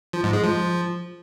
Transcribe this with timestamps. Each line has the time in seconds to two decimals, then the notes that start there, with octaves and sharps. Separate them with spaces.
0.13 F3
0.23 G#2
0.33 G#3
0.43 F3